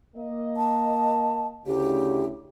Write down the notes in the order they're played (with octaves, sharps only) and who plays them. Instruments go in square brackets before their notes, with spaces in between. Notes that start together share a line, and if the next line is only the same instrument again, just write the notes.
[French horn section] A#3 D#5
[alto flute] A5
[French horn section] D2 C#3 E4 [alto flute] G4